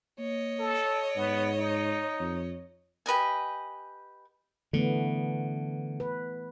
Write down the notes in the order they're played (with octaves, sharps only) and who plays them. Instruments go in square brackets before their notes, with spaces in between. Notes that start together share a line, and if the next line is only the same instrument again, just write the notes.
[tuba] A#3 [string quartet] C#5 D#5
[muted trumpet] A4
[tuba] G#2 [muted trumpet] B3
[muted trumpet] D#4
[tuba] F2
[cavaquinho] G4 B4 D#5 G#5
[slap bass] D3 [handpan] E3 A3 B3
[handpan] B4